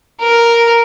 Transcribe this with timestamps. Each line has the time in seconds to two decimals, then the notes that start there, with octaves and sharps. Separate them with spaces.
0.21 A#4